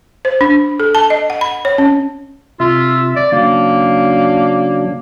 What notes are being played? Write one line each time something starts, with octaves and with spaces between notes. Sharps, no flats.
C5
D4
A4
A5
D#5
F#5
B5
C#5
C#4
C3 F4 E5
D5
C#3 F#3 A#3 D4